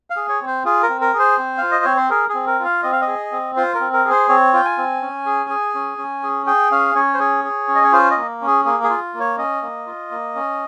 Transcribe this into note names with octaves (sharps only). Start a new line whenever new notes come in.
F5
G#4
C#5
C4
C5
F4 G#4
A#4
C4
A#4
G#4
C5
C4
F4 F5
D#5
C4 C#5
C5
G#4 A#4
G#4
C4
A#4
F4
F5
C4 D#5
F5
D#5
G#4
C4
F4 C5
A#4
C4
A#4
G#4
C5
C4 C#5
F4 G5
G#5
C4
C#4
G#4
G#4
C#4
C#4
G#4
G#4 G5
C#4 F5
C#4 C#5
C5
G#4 C#5
G#4
C#4
D#5
C#5
F4 C5
D#5
A#3
C#4
G#4
A#3 G#4
G#4
F4
A#3
C#5
C#4 D#5
A#3
F4
A#3
C#4